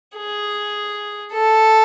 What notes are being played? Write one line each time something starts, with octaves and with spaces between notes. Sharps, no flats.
G#4
A4